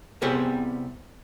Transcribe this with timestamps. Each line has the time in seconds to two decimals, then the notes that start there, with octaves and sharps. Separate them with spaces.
0.22 C2 C3 G3 B3 G#4 C5